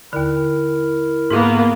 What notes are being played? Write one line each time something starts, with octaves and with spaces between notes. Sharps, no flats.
D#2 D3 E4 A#4
G#2 A#3 B3